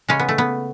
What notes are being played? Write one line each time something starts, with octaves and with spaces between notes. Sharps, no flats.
C#3 G#3 C#4
B3
A3
B3